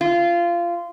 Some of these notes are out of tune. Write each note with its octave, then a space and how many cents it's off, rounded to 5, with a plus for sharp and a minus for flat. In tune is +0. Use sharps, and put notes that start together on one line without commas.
F4 -20